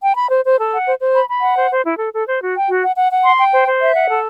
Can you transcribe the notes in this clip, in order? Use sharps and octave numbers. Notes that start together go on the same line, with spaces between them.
G5
B5
C5
C5
A4
F#5
C5
C5
B5
B5
F#5
C5
C5
E4
A4
A4
C5
F#4
G5
F#4
F#5
F#5
F#5
C6
G5
C5
C5
E5
F#5
A4